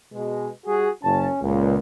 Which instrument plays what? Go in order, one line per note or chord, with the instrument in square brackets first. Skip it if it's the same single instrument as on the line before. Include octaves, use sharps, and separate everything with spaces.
[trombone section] B2 G#3
G3 F#4 G#4
[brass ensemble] F#1 A5 [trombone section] C#4
[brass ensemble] C#2 [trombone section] A#2